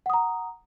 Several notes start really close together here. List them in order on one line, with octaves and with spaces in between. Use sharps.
F#5 D#6 A#5